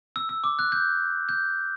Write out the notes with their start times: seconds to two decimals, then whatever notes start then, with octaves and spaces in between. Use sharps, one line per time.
0.16 E6
0.29 E6
0.44 D6
0.59 F#6
0.72 G6
1.29 G6